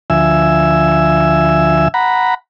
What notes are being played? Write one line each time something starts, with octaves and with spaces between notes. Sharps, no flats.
D2 F3 E5 G#5 E6
F#5 A#5 B5